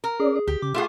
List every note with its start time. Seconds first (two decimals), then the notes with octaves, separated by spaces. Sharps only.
0.04 A#4
0.20 C#4 G#4 D5
0.36 G#4
0.47 D2 G4
0.62 C#3 D6
0.74 A3 F4 G#4 F#5 C6